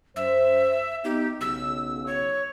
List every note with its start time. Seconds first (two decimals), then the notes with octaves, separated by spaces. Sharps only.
0.16 F#2 C5 E5
1.05 B3 D#4 G4
1.41 B1 C#3 E6
2.06 C#5